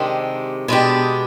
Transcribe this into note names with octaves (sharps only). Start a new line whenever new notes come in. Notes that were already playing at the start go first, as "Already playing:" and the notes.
Already playing: C3 D#3 G#3 D4 G4
B2 G#3 D4 G4